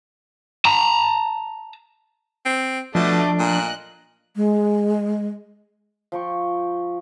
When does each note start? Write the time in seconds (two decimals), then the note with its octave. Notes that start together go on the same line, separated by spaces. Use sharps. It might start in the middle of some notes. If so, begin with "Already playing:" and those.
0.65 A5 A#5
2.46 C4
2.95 B2 F3 A3 D4 D#5 D6
3.40 A#2 D#5 F#6
4.36 G#3
6.12 F3 G5 C#6